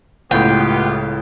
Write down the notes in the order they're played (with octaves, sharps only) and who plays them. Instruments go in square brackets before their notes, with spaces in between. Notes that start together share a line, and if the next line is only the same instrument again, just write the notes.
[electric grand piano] C#2 A2 [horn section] B3 F4 G4 [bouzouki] G5